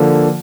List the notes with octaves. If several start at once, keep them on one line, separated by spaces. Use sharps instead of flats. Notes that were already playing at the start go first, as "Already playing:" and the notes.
Already playing: D3 F3 A#3